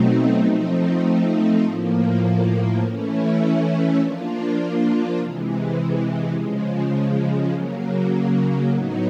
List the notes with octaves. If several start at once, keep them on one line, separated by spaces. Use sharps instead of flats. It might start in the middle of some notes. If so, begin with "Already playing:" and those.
Already playing: B2 F#3 A3 C4 D#4
F3 A3 C4 D#4
A2 F3 A#3
E3 A3 C#4 E4
F3 A#3 D4 F4
C3 E3 G#3
C#3 F3 G#3
C#3 F#3 A#3
A2 F#3 B3 D#4